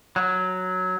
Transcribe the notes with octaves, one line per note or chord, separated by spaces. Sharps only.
F#3